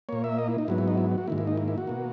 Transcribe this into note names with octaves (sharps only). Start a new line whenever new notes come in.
A#2 A#3 C#5
E5
D#5
E4
D#4
G#2 F#3 B3 E4
E4
D#4
E4
F#4
G#2 D#3 A#3 E4
E4
D#4
E4
E4
F#4
B2 A#3